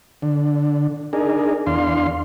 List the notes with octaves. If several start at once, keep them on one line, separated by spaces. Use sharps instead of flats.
D3
D4 D#4 G#4 A#4
E2 D4 F5 C6